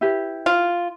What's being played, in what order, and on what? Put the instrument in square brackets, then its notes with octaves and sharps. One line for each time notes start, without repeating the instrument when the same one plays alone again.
[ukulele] E4 G4 B4
[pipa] F4